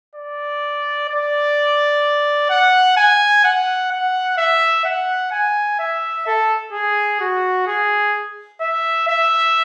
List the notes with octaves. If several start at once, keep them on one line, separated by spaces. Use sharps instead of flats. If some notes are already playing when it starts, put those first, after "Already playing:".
D5
D5
F#5
G#5
F#5
F#5
E5
F#5
G#5
E5
A4
G#4
F#4
G#4
E5
E5